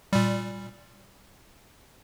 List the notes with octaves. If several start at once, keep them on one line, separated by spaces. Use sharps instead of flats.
A#2 G3